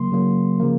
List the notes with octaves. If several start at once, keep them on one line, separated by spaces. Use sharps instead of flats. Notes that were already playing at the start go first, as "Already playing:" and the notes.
Already playing: C#3 F#3 A#3 C6
C#3 F#3 A#3
C#3 F3 A#3